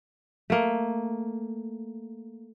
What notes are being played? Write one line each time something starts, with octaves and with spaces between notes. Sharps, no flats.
A3 A#3